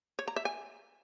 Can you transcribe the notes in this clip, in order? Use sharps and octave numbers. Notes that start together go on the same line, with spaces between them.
C#5
A#5
E5
G#5